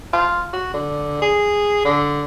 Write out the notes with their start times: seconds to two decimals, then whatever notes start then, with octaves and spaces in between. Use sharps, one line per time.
0.13 F4
0.53 F#4
0.74 D3
1.22 G#4
1.85 D3